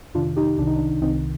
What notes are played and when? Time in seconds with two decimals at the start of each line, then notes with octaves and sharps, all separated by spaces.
0.14 F2 C3 D#3 D4 F4
0.36 D#4 G4
0.58 C2 C3 D#3 D4
0.67 D#4
0.76 D4
1.02 C2 C3 D#3 C4 D#4